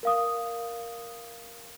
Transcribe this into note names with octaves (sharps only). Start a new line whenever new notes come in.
A#4 F5 D#6